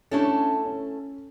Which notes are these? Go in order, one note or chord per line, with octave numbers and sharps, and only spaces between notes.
A3 C#4 D4 E4 A4
C#4